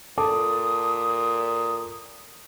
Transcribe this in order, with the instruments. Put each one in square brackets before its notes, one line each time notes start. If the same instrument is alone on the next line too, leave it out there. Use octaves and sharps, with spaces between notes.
[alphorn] A#2 [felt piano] A4 A5 D6 [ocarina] D#6